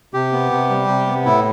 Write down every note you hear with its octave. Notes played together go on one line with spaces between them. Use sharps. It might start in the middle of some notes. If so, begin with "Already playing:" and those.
C3 G4
B3
C3
G3
C3
B3
A2 E4